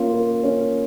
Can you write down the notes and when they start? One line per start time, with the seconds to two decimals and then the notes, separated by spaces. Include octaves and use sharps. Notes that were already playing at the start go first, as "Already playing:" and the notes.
Already playing: A#3 C#4 F4
0.13 A#4
0.44 C#4